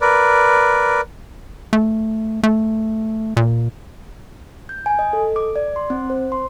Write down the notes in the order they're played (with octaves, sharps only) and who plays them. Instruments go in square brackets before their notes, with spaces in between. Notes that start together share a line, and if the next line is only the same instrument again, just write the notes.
[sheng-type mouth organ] A#4 B4 D5
[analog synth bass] A3
A3
A#2
[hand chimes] G6
G#5
D#5
A4
D6
D5
C6
C4
C5
C6